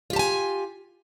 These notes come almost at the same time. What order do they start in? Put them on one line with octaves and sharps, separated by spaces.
F4 G4 A5 G#5